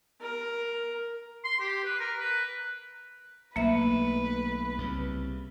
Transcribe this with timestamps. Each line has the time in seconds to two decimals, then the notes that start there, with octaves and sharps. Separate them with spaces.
0.21 A#4
1.44 C6
1.60 G4
1.84 B4
2.00 A#4
2.18 B4
3.56 B1 A3 A#3 B4 E5
4.78 C2 C#3